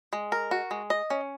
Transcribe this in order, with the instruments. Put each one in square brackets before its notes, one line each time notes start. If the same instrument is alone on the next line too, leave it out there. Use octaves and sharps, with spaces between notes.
[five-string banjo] G#3
A#4
F#4
G#3
D#5
C#4